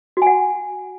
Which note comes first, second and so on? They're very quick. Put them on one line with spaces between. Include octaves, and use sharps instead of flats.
F#4 G#5 F#5